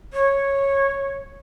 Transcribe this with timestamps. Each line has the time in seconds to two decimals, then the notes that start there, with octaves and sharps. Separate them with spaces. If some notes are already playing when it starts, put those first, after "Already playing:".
0.13 C#5